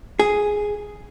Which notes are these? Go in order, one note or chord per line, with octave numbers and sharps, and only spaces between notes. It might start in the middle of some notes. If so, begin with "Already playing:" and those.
G#4